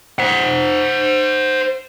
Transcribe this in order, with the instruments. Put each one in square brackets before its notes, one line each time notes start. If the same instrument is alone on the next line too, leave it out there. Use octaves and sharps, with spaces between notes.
[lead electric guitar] C5 F#5